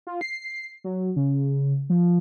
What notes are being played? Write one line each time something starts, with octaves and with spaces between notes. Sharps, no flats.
F4
C7
F#3
C#3
F3